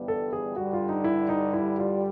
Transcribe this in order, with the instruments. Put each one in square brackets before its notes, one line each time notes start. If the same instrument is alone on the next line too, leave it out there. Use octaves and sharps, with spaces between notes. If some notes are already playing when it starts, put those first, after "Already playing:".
Already playing: [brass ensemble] G1 G2 E3 G3 B3
[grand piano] A4
G#4
[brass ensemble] G2 D3 G3 [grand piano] F#4
[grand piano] F4
D#4
E4
D#4
E4
F4